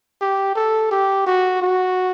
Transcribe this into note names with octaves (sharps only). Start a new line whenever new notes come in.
G4
A4
G4
F#4
F#4